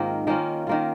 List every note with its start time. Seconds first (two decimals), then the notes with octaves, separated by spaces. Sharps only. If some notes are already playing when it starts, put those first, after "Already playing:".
Already playing: G#2 D#3 A#3 C4 F4
0.27 D#3 A#3 C#4 F4
0.67 D#3 A#3 F4